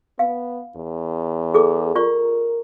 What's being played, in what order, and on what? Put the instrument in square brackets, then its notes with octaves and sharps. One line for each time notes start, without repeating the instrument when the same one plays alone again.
[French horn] B3 [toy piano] F5
[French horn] E2
[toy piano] G#4 A4 D6
[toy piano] F4 D5 C#6 [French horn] A#4